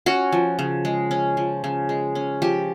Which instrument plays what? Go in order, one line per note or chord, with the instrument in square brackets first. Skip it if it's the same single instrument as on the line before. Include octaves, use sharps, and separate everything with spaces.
[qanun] C#4 F#4
F3
C#3
G#3
C#4
F3
C#3
G#3
C#4
F3 G4